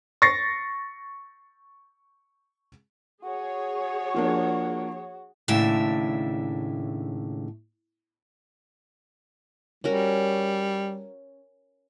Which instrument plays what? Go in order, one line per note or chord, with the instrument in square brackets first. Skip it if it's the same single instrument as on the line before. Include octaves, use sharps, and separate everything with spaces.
[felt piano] C#6 A6 A#6 C7 C#7
[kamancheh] F#4 [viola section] G#4 C#5
[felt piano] F3 A#3 D4
[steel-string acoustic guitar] D#2 A2 C#3 D4 E5
[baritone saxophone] G3 [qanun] C#4 F#4 A#4